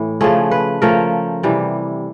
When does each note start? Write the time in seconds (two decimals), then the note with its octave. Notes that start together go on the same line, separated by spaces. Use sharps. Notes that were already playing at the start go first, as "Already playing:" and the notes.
Already playing: A2 E3
0.21 C#3 F3 A3 G#4
0.51 B4
0.82 C#3 F3 A3 A#4
1.43 C3 E3 G3